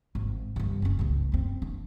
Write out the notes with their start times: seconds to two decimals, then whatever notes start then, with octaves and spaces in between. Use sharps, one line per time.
0.15 G#1
0.56 G2 D3
0.82 F#1 C#4
0.99 C#2 A2
1.32 F#2 C4
1.62 D4